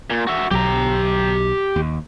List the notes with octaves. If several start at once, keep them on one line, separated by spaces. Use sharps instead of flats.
A#2
F#4 E5
B1 F#3 G4 A#5
D#2